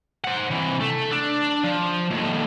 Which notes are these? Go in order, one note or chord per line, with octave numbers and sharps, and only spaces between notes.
C5 F#5
C3 E3
A3
D4
F3
D#2 A2